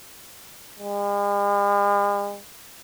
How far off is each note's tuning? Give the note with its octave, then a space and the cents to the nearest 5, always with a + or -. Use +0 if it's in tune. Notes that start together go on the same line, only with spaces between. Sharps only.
G#3 -45